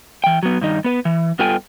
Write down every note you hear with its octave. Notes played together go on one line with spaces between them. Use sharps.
E3 G5
F#3 B3
G2 D#3 D#4
B3 B4
E3
G2 B3 F4 A4 G5 G#5